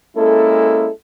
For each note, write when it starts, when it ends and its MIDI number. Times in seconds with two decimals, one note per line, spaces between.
0.17 0.88 56
0.17 0.88 58
0.17 0.88 61
0.17 0.88 64
0.17 0.88 69